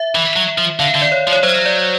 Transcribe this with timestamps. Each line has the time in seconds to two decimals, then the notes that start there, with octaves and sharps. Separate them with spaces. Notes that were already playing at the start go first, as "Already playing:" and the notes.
Already playing: E5
0.15 E3
0.36 F#3
0.58 F3
0.80 D3 F5
0.95 D3
1.02 D5
1.12 C#5
1.27 F3
1.33 C#5
1.43 F#3 C5
1.66 D5